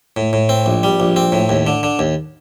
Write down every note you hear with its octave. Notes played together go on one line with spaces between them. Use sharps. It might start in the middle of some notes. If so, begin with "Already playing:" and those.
A2
A2
C4
A#1
G3
A#1
C4
A2
D#2
D3
D3
D#2